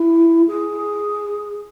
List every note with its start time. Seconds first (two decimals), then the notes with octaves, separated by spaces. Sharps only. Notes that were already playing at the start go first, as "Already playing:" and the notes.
Already playing: E4
0.47 G#4